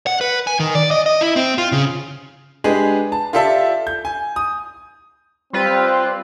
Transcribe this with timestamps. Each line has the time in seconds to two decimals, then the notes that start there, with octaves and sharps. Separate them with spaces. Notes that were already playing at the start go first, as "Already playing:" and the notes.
0.07 F#5
0.21 B4
0.47 G#5
0.60 D#3
0.75 D5
0.91 D#5
1.06 D#5
1.21 E4
1.36 C4
1.58 F4
1.72 C#3
2.64 G#3 D4 G4 G#4 B4
3.12 A5
3.33 F4 G4 A4 D5 E5 A5
3.87 G6
4.05 G#5
4.36 D#6
5.53 G3 C4 F4 B4